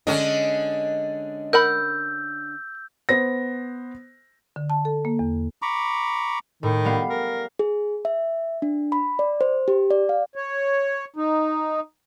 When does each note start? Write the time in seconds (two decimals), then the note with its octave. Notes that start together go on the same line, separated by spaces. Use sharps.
0.07 D3 G#3 C#4 D4 D#5
1.53 A#4 F#5 B5 E6 G6
3.09 B3 C5 A#6
4.56 D3
4.70 A5
4.85 A4
5.05 A#3
5.19 E2
5.62 A#5 B5 C#6 D6
6.63 A2 D#3
6.85 G3 B3 F5
7.10 A#4
7.59 G#4
8.05 E5
8.62 D4
8.92 B5
9.19 D5
9.41 C5
9.68 G4
9.90 D5
10.09 F5
10.36 C#5
11.16 D#4